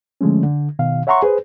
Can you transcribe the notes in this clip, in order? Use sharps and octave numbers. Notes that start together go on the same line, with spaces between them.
D3 F3 G#3 A3 C#4
D3
B2 D#3 F5
C#5 E5 F#5 A#5 C6 C#6
G#4 B4 C5